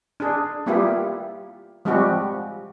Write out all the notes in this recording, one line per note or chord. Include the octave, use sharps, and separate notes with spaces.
D4 G#4
G3 A#3 B3 E4 F4 G4
F3 G3 G#3 C4 F#4 G4